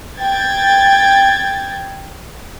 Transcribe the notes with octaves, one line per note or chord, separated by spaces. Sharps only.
G5 G#6 A6